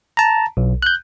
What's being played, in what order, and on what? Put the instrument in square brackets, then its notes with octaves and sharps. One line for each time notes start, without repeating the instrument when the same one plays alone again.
[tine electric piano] A5 A#5
B1
F#6 G6